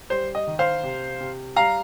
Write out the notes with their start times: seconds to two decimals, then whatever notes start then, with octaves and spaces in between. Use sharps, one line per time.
0.10 G3 C5
0.35 D#5
0.47 D#3
0.59 C5 F5
0.83 C3
1.21 C3
1.56 G3 F5 A#5